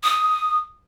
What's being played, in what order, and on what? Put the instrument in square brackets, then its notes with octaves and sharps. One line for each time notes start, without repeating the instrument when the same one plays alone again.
[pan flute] D#6